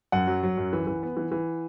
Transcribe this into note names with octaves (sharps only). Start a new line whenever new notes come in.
F#2 F#5
F#3
F#3
F#2
E3
E3
B3
E3
E3